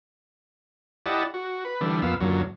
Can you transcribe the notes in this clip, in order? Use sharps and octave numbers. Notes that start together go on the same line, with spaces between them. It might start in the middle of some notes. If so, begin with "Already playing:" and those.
E4 G4 D5 D#5 F#5 A5
F#4
B4
D3 E3 G3 A3 D4
F2 A#2 B3 F5 E6
F#2 A#2 D3 F#3